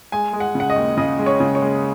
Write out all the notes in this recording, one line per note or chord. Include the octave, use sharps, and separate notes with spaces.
G#3 G#5
G#3
F#5
C#3 F#5
D#5
D#2
C#3 D#5
G#3
C#5
C#3
C#5
G#3